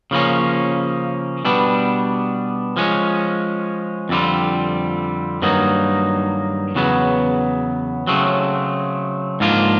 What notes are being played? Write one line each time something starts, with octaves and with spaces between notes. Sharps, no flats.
C#3 F3 A#3 C#4
B2 G3 B3 D4
F3 G#3 C#4
F2 D3 G3 C4 F4
G2 D#3 F#3 A#3 D#4
E2 C#3 F#3 B3
C#3 F#3 A3 C4
G#2 F3 A#3 D4 F4